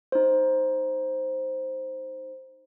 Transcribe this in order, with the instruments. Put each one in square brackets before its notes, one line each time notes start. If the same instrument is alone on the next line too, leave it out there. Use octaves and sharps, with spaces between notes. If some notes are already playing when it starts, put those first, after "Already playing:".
[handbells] D#4 C5